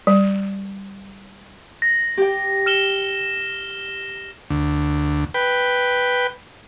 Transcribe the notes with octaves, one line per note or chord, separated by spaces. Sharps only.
G3
A#6
G4 G5
F6 E7 G7
D2
B4 G5